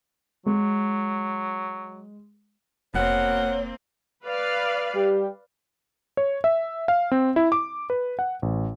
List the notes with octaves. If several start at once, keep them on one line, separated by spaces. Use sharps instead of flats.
F#3 G#3
F1 B2 A#3 C4 A#4 C#5 F#5
B4 D5 F5
G3 G4
C#5
E5
F5
C4
E4
D6
B4
F#5
A1